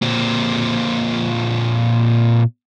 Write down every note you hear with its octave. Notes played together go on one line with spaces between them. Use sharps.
A#2 C4